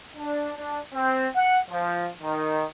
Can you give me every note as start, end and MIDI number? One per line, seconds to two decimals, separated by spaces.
0.17 0.50 62
0.56 0.79 62
0.94 1.29 60
1.34 1.58 78
1.69 2.09 53
2.22 2.64 51